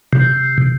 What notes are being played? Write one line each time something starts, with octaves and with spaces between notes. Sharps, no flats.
C3